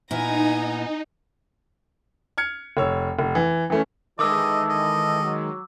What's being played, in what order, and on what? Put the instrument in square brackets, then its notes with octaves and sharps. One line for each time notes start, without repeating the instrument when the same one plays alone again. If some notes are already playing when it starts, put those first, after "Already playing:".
[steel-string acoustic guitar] A#2 B3 E4 [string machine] D#4 [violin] G#5 A#5
[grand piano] F6 G#6 C#7
F1 C#5 E6
F1
E3
E3 A3 C#4
[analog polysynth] D#3 G#3 [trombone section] E3 A4 [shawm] D#5 [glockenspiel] D6 E6
[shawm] D#5
[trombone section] F#3